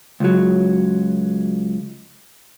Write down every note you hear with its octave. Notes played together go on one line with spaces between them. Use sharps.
C#2 F#3